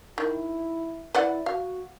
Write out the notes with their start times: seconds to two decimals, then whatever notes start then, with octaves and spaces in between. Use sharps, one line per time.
0.18 D#3 E4
1.14 E4 B4 D5 F#5
1.46 F#4 F5